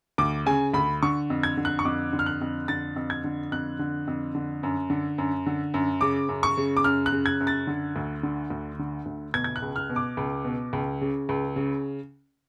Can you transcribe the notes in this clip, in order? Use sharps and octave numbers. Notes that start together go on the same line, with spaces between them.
D2 D6
C#3 G#5
D2 B5
D3 C#6
F2
G#6
D3
F#6
C#6
F2 D6
D3
F6
F#6
F2
D3 A6
F2
G#6
D3
F2 F#6
D3
F2
D3
F#2
D3
F#2
D3
F#2
C#3 D6
F#2
C#6
C#3
D6
F#2 F6
F#6
C#3
G#6
F#2
A6
D3
D2
D3
D2
D3
D2
B2 G#6
G#6
F#6
C#2
F6
B2
D6
C#2
B2
C#2
C#3
C#2
C#3